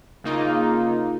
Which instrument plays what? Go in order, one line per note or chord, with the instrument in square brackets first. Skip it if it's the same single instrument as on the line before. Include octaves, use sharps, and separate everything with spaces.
[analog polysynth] C#3 A#3 D#4 F4